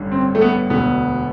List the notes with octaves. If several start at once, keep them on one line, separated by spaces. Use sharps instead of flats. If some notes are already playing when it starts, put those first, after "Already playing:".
Already playing: A1 G2 D3
C4
A3
B3
E1 D2 D3 B3